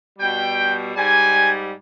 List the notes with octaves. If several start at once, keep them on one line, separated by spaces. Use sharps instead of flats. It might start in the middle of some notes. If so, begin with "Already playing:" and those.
B2 G3 G5
G#2 G3 G#5